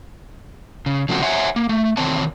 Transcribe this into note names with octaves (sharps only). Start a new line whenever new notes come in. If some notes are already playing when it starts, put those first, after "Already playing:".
C#3
C#3 F3 A3 C4 F#4
C5 C#5 E5 F#5 G#5
A#3
A3
E2 C3 D#3 C4 C#5 A5